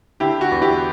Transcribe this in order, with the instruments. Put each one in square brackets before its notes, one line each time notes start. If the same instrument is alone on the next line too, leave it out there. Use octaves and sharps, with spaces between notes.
[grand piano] D3 E4 G4
F#4
E2
E4 G4